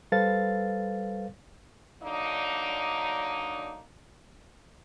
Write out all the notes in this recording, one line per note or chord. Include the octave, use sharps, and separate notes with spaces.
G3 A4 B4 C5 F5 A6
D3 F#3 A#3 D4 D#4